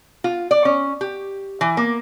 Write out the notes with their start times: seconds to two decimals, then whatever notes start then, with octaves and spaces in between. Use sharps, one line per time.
0.24 F4
0.51 D5
0.65 C#4
1.01 G4
1.61 E3
1.77 A#3